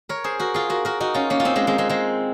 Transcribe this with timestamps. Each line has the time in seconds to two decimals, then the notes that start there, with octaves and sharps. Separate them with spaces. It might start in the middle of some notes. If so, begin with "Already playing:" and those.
0.09 A#4 C#5
0.24 G#4 C5
0.40 F#4 A#4
0.54 F4 G#4
0.70 F#4 A#4
0.85 F#4 A#4
1.00 D#4 F#4
1.14 C#4 F4
1.30 A#3 C#4
1.40 F4
1.45 C4 D#4
1.56 G#3 C4
1.67 G#3 C4
1.78 G#3 C4
1.89 G#3 C4